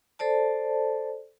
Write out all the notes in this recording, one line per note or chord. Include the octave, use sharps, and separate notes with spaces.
A4 C5 D5 A5